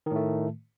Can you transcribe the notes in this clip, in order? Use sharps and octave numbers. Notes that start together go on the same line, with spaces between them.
A2 D#3 A3